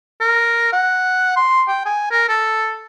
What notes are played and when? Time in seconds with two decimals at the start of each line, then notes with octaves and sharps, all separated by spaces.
0.21 A#4
0.73 F#5
1.36 C6
1.68 G5
1.86 G#5
2.11 A#4
2.29 A4